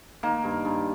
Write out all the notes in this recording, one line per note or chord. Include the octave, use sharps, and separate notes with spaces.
D#3 A#3
G2
G2